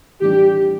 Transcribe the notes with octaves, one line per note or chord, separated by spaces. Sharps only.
A2 E3 G3 D4 G4